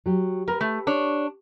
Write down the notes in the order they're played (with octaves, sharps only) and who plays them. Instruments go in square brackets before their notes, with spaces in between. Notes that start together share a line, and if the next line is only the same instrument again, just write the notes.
[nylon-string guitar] F#3 G4
[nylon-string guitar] G4 B4 [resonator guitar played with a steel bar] A#4
[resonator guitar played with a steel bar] A3
D4 C#5